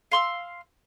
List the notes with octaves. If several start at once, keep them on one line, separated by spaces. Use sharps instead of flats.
F5 C6 E6